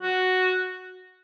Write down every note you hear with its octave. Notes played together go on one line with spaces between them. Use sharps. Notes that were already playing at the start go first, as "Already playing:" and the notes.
F#4